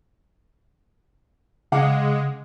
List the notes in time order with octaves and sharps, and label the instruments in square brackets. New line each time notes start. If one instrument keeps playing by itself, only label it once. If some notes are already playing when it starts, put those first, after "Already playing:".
[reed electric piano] C#3 [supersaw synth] G#3 [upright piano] F5 F#5 D6